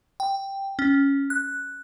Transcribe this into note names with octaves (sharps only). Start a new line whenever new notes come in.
G5
C#4
F#6